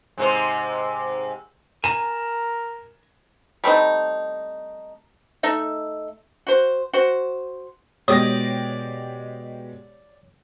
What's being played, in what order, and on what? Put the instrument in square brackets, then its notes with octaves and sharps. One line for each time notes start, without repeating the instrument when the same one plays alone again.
[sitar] G#2 C3 C5
[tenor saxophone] A#4 [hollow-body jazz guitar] G#5 A#5 [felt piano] E7
[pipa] G3 A3 C4 D#4
A3 D#4 E5
F#4 C5
F#4 C5
[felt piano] B2 [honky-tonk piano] G#3 G4 A#6 [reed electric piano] C#5 [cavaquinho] D5 D#6